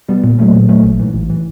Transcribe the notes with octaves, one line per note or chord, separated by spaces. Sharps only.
B2 G3 B3
A#2
F#3 A3 C#4
A#2
F#3 A3 C#4
A1
G#2 E3
A1
E3